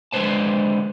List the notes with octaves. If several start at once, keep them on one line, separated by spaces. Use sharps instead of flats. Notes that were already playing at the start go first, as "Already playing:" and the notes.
D3 G#3 B4 C5 A5